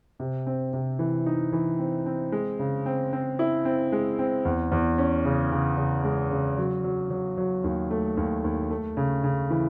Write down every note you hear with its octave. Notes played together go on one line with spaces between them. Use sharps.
C3
C4
C3
E3
D#4
E3
C4
C4
G#3
C#3
C4
C4
E4
C4
G#3
C4
E2
E2
C#4
C#3
C#3
C#3
G#3
C#3
F#3
F#3
F#3
F#3
D#2
A3
D#2
D#2
A3
C#3
C#3
E3